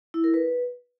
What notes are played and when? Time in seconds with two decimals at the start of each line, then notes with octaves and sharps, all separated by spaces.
0.14 E4
0.24 A#4
0.34 B4